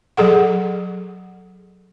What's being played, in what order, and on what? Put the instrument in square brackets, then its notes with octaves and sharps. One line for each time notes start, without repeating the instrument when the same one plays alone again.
[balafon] F#3 G#4 A4 F#5